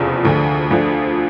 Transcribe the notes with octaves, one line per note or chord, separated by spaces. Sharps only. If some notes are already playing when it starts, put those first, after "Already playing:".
Already playing: F1 E2 C#3 F3
D2 D3 F3
D2 D3 F3